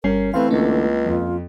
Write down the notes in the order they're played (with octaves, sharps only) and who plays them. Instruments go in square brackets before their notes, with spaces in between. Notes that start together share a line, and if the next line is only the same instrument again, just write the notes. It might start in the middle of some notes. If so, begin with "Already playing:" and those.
[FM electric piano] G1 G3 C7 [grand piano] C#4 [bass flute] A#4
[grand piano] E3 A3 [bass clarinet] C4 [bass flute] B4 [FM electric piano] F5 C6
[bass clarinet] C#2 [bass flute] D3 [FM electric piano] A#3 C4 C#4
[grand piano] F2 [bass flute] F4